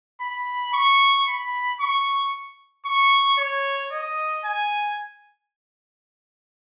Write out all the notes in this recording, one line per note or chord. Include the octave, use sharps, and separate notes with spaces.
B5
C#6
B5
C#6
C#6
C#5
D#5
G#5